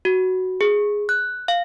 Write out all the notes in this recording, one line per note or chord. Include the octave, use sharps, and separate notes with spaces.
F#4
G#4
F#6
F5